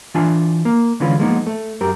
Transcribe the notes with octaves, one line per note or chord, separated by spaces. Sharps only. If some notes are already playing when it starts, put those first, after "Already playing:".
E3 D4 F4 G#5 A5
A#3
D3 E3 G#3 C#4 F4 B4
F3 G#3 A#3 B3 D4 D#4
A3
F#2 G4 A#4